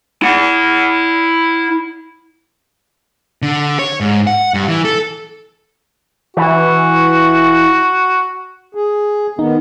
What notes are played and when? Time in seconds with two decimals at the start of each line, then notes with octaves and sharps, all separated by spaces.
0.22 E4 F#5
3.42 D3
3.79 C#5
4.01 G#2
4.27 F#5
4.54 G2
4.68 E3
4.85 A4
6.37 E3 F#4
8.75 G#4
9.39 D#3 B3 D#4